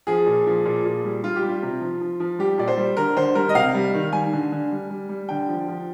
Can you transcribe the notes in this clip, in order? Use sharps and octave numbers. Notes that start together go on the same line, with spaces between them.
F3 G#4
A#2
F3
A#2
A#2
G3
G3 F4
G4
G3
F4
C3
F3
F3
F3
G3 G4
A#2 D5
C5
G3
D3 A#4
D3 C5
G3 A#4
D#5
C3 F5
G3
D#3
G3 G#5
D3
D3
G3
G3
G3
D3 G5
F3
F3